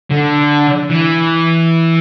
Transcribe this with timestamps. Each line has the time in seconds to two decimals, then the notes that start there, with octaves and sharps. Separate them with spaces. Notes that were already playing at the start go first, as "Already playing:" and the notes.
0.11 D3
0.90 E3